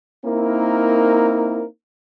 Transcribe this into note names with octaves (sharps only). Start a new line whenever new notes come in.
A#3 C4 D#4 E4 A#4